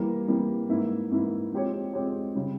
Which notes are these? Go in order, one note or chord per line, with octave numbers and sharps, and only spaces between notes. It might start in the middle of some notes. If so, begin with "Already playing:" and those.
Already playing: E3 G3 A#3
E3 G3 A#3
G#2 E3 A#3 E4
G#2 E3 A#3 E4
F3 G#3 C4 G4 C#5
F3 G#3 C4 G4 C#5
C#3 G3